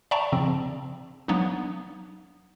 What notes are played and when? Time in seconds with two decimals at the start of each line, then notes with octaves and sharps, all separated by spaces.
0.11 D5 E5 G5 A5 A#5 C#6
0.32 C#3 F3 C4
1.28 F#3 A#3 B3 D4 D#4